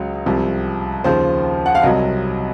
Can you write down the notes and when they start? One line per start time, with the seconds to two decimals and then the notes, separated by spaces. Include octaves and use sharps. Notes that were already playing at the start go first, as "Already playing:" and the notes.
Already playing: C#2 C#3 F#3
0.26 C2 C3 F3
1.04 D#2 C#3 F3 C5
1.66 F#5
1.75 F5
1.83 C2 C3 F#3 D#5